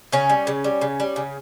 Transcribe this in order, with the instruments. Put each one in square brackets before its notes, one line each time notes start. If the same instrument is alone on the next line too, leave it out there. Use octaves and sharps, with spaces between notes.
[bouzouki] C#3 C#4
G3
C#3
G3
C#3
G3
C#3